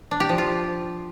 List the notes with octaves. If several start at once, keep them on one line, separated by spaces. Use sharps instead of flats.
D4
G4
F3
F4